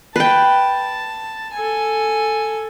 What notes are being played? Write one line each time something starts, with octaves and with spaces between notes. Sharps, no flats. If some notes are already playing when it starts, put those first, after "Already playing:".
B4 G5 A5
A4 G#5